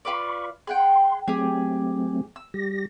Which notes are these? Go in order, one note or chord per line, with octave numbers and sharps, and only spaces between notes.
F4 B4 D5 B5 C#6
G#4 F#5 G5 C6
F#3 A3 C4 G4 G#4
E6
G3 G4 A#6